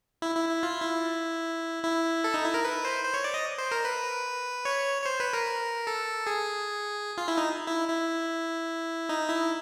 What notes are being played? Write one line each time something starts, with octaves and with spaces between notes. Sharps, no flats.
E4
E4
E4
F4
E4
E4
A4
D#4
E4
A#4
B4
C5
C5
C#5
D5
D#5
C5
A#4
B4
C#5
C#5
C5
B4
A#4
A4
G#4
F4
E4
D#4
E4
E4
D#4
E4